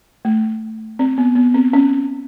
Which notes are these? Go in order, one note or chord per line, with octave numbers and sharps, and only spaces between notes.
A3
C4
B3
B3
C4
C#4